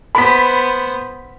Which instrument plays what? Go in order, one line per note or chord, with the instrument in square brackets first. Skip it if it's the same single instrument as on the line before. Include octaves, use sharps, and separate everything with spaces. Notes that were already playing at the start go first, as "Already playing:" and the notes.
[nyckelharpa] B3 C5 [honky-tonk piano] B5 B6